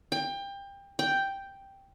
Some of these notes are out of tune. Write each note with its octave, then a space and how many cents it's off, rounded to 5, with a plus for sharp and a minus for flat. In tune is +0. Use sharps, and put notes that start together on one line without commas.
G5 +25
G5 +0